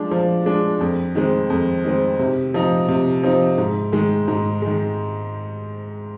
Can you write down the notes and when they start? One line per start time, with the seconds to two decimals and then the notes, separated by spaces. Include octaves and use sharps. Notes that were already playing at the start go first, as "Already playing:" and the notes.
Already playing: F3 G#3 D4
0.11 F3
0.46 G#3 D4
0.81 F2
1.15 D#3 G#3 C4
1.50 F2
1.85 D#3 G#3 C4
2.19 C3
2.54 F3 C4 D#4
2.88 C3
3.23 F3 C4 D#4
3.58 G#2
3.92 D#3 G#3
4.28 G#2
4.62 D#3 G#3